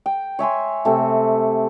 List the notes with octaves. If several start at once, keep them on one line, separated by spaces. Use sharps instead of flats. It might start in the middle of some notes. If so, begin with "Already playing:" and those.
G5
C#5 E5 G#5 C6
C3 A3